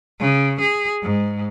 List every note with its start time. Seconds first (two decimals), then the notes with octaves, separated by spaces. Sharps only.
0.19 C#3
0.59 G#4
1.02 G#2